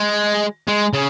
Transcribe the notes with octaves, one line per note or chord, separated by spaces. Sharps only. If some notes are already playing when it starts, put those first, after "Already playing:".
Already playing: G#3
G#3
C#3